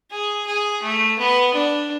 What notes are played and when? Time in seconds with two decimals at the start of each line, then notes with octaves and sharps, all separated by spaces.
0.11 G#4
0.46 G#4
0.83 A3
1.19 B3
1.54 D4